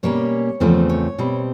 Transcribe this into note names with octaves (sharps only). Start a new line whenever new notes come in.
B2 G3 A#3 C#4 C#5
E2 C#3 F3 A3 C4
C#5
B2 G3 C4